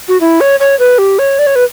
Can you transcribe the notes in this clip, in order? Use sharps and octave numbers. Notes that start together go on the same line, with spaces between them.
F#4
E4
C#5
C#5
B4
G4
C#5
D5
C#5
B4